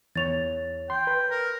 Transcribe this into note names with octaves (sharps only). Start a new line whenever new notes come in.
E2 C#5 A6 F7
G5 C6
B4
A#4